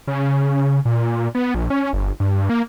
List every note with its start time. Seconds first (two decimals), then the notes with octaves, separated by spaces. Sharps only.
0.08 C#3
0.85 A#2
1.35 B3
1.55 A#1
1.70 C#4
1.93 G1
2.20 G2
2.50 A#3